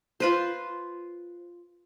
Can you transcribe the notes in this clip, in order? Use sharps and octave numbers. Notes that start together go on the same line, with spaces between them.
F4 B4 C5